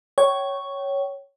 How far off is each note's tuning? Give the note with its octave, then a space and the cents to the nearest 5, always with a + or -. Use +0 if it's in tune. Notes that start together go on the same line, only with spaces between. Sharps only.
C#5 +0 G5 -30